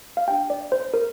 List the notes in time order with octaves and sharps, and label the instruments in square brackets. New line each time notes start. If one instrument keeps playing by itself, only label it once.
[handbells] F5
D4 G4 G5
D5
C5
A#4